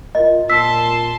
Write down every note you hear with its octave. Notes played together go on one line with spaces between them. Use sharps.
F4 A#4 D#5
A#2 A5 C6 E6 B6